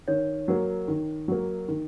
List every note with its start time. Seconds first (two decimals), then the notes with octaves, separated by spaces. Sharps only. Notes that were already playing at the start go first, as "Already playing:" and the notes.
0.08 D#3 C#5
0.48 F#3 A#3
0.88 D#3
1.28 F#3 A#3
1.68 D#3